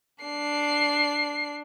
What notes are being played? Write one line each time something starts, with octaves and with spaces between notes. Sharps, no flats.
D4 C7